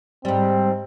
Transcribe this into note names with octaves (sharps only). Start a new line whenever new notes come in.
G#2 G3 C4